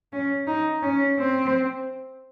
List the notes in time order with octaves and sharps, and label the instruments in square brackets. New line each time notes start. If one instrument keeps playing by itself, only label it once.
[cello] C#4
D#4
C#4
C4